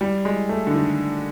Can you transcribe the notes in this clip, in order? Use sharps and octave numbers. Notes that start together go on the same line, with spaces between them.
G3
G#3
A3
D3
D#3